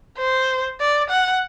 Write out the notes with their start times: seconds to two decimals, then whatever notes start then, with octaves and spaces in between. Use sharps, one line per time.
0.18 C5
0.80 D5
1.10 F#5